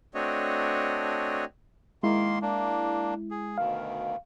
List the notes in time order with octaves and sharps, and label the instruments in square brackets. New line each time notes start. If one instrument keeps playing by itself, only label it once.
[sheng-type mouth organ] A3 C4 D4 F#4 C#5 D#5
[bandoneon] D#3 A#3 C6 [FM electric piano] G#3 E4
[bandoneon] A#3 D4
G#4
[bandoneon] D2 B2 D#3 [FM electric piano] F5